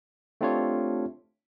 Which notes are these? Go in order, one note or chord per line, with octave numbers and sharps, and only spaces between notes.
A3 C4 D4 F4 G4 C#5